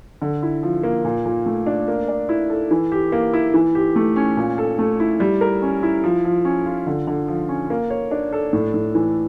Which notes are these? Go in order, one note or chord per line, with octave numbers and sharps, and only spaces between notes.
D3
E4
F3
A#3
A#2
A#2
A3
D4
A#3
D5
E4
A4
E3
G4
A#3
E4
E3
G4
A3
C#4
A#2
A4
A3
E4
G3
A#4
C#4
E4
F3
F3
C#4
F4
D3
D3
F3
C#4
A#3
C#5
D4
A4
A2
A2
E3